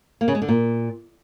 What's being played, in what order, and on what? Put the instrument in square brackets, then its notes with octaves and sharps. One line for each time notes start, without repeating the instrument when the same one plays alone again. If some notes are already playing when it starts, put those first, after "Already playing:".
[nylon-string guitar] A#3
C#3
G#3
D3
A#2